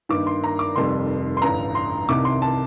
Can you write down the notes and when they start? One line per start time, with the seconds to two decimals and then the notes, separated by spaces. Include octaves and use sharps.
0.09 G2 D#3 A#3 D6
0.27 C6
0.44 A#5
0.59 D6
0.76 F1 F2 D#3 G3 C6
1.37 C6
1.42 A1 G2 D3 A#5
1.75 C6
2.08 C2 C3 D#3 D6
2.25 C6
2.42 A5